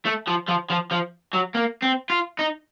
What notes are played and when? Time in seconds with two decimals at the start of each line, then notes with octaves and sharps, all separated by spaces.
0.05 A3
0.27 F3
0.48 F3
0.70 F3
0.91 F3
1.33 F#3
1.54 A#3
1.82 C4
2.10 F4
2.39 D#4